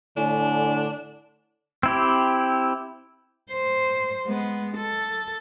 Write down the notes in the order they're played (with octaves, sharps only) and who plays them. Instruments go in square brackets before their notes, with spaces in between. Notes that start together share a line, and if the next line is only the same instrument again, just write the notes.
[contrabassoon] A2 [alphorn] D3 [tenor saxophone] D4 [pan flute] G#5
[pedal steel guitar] C4 E4 G4
[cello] C5
G#3 B3
A4